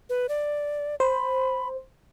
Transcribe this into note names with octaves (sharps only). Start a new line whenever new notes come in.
B4
D5
C5 B5